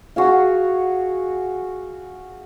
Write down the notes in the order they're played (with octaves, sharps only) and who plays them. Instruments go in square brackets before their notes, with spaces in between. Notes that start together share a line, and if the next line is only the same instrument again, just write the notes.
[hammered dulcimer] F#4 G#4 F5